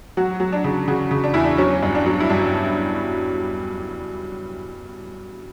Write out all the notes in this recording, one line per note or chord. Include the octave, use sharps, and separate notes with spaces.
F#3 F#4
F#3
D4
C#3
C#3 F#4
C#3
D4
E2 E4
D4
F#3 C#4
G2
D4
F#3
E4
G2 D4